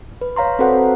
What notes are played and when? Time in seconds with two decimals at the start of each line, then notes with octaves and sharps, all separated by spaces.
0.21 B4
0.36 C#5 F5 A#5 C6
0.59 C4 F#4 A4 B4 C5 F#5